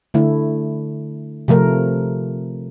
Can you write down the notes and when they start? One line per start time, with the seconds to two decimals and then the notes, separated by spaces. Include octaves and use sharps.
0.14 D3 A3 E4
1.48 C3 F3 A3 A#4